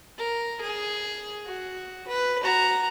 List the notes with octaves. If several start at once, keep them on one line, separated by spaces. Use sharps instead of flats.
A#4
G#4
F#4
B4
F#4 A#5